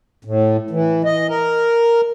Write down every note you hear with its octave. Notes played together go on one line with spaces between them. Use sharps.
A2
E3
D#5
A#4